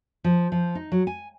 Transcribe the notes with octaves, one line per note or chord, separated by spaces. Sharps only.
F3
F3
D#4
F#3
G#5